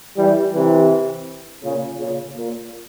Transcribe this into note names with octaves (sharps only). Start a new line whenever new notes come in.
E3 G3
C3 E3
A#2 C#3
A#2 C#3
A#2